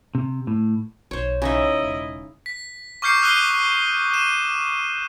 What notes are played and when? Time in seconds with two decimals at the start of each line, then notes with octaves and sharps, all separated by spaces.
0.15 C3
0.47 A2
1.11 B1 C5 C#5
1.42 C#3 D#4 E4 D#5 E5
1.83 E1
2.46 B6
3.02 C#6 D6 F6 G6 C7 C#7
3.22 D#6 F6 F#6 C7 D#7 G7
4.14 D#7 E7